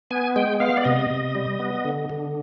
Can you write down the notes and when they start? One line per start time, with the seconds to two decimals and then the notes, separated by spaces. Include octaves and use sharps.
0.11 B3 G#5
0.36 G#3 G5
0.60 B3 F5
0.77 D5
0.85 C3 D#5
1.10 C3
1.35 G3
1.60 B3
1.85 D3
2.10 D3